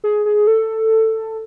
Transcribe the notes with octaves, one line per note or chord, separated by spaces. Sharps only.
G#4
G#4
A4